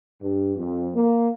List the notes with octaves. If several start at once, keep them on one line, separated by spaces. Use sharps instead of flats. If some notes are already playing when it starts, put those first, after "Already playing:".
G2
F2
A#3